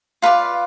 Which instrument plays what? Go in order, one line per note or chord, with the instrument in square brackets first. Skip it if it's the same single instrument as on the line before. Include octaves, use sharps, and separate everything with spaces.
[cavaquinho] F4 B4 D5 F5